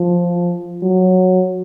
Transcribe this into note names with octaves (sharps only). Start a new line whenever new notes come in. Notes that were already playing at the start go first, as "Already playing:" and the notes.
Already playing: F3
F#3